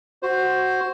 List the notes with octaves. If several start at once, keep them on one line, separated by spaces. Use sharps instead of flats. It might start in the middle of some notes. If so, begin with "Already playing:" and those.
F#4 C5